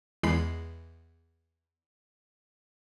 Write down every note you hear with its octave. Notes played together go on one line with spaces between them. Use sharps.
E2 G#3 B5 C7